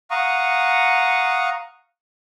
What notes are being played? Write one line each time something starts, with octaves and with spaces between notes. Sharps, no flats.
F5 F#5 A#5 C#6 D#6